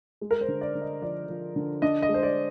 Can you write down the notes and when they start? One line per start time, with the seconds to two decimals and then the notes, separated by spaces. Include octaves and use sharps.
0.21 G#3
0.31 A#4
0.41 C5
0.48 D3
0.61 D5
0.75 D3
0.81 D#5
1.02 F3 D5
1.29 F3
1.56 D3
1.82 D4 D#5
2.02 D#5
2.09 G#3
2.14 C5
2.23 D5